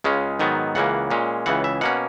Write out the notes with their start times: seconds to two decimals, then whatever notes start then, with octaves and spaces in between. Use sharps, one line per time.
0.04 C#2 C#3 G#3 C#4
0.39 G#2 D#3 F#3 B3
0.75 C#2 C#3 E3 A#3 F#5
1.11 A#2 G#3 C#4
1.46 C#2 C#3 E3 F#5
1.64 E5
1.81 B2 A#3 C#4 F#5